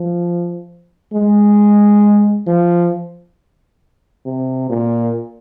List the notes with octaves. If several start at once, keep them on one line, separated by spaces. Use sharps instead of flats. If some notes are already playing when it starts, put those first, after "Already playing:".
Already playing: F3
G#3
F3
C3
A#2